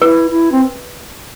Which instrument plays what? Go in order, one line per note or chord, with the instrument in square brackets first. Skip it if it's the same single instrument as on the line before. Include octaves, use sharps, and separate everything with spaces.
[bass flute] E4 [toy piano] B4
[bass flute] E4
C4